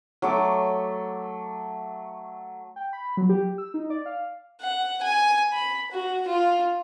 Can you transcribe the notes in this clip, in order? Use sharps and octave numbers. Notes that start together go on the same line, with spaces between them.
F#3 A3 D6
G5
B5
F#3
G4
E6
D#4
D5
F5
F#5
G#5
B5
F#4
F4